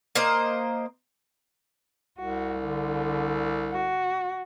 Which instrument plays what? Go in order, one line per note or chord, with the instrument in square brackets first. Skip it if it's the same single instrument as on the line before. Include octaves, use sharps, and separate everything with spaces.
[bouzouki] A#3 C5 D#5
[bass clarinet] C2 [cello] F#4
[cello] D3
F#4